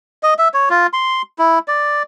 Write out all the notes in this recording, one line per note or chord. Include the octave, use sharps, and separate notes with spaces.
D#5
E5
C#5
F4
C6
E4
D5